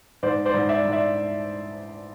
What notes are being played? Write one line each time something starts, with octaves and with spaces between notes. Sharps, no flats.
G#2 C5 D5
C5 D5
G#2
D5 E5
G#2
D5 E5